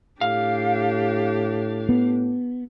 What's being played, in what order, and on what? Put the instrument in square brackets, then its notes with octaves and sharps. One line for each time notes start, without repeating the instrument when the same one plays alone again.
[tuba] A2 [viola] D4 G4 [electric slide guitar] F5
[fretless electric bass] B3